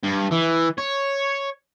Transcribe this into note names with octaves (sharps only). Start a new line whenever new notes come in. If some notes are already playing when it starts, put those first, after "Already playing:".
G2
E3
C#5